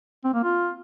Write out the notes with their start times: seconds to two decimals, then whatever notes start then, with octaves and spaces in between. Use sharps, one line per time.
0.24 C4
0.34 A#3
0.44 F4